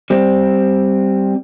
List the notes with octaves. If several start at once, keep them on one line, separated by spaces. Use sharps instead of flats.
G3 C4